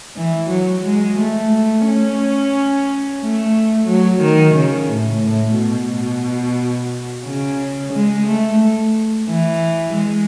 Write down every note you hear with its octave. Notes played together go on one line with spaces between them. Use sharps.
E3
F#3
G#3
A3
C#4
A3
F#3
D#3
C#3
A2
A2
B2
C#3
G#3
A3
E3
G#3